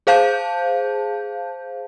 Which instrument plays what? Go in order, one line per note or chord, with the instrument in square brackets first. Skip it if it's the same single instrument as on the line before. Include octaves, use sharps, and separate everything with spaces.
[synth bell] G#4 C5 F5 A5 G6